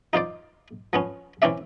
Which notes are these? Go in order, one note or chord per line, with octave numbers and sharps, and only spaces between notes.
D#4 F4 C5 D5
F3 B3 C#4
E3 C4 C#4 D5 E5